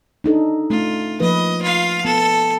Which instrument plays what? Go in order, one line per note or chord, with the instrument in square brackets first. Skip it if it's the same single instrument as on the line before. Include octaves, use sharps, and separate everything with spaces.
[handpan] D4 D#4 A4
[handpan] A3 C#4 [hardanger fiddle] F4
[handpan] F3 A#3 B4 [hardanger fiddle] D#5
[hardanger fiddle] F4 F5
[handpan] B3 [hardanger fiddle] A4